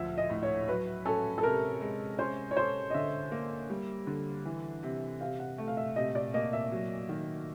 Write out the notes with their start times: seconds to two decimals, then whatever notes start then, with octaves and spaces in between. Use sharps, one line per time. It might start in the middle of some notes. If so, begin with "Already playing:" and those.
Already playing: D2 F3 E5
0.17 D#5
0.30 A2
0.43 C#5
0.68 F#3 B4
1.05 C#4 A4
1.38 A4
1.43 C3 A#4
1.81 G#3
2.18 C#4 C5
2.51 C#5
2.57 A4 C5
2.90 D#5
2.94 D3 E5
3.32 A#3
3.70 G3
4.07 D3
4.45 E3
4.83 C3
5.20 C3 F5
5.39 F#5
5.58 A3
5.68 F5
5.77 E5
5.96 C3 D#5
6.15 D5
6.34 A#3 D#5
6.53 E5
6.72 F#3
7.09 D#3